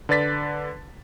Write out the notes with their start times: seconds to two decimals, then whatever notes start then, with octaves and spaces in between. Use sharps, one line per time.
0.09 D3 B4 D5 A6 B6